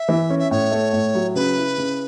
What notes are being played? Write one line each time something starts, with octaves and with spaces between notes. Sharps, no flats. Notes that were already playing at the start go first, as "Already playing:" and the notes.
Already playing: E5
E3
C#4
E5
A2 C#5
A3
A2
F#3
C#3 B4
E4
C#3